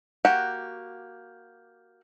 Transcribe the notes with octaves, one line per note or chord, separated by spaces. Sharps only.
A#3 F#4 G4 F#5